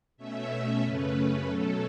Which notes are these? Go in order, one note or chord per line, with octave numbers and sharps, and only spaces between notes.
B2 A3 C#4 E5
F#2 C#3 A3 C#4 B4
B2 F#3 A3 C#4 A4